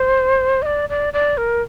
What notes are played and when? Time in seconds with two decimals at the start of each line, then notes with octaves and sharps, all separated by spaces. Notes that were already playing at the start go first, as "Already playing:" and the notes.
Already playing: C5
0.62 D#5
0.66 D5
0.89 D5
1.13 D5
1.37 A#4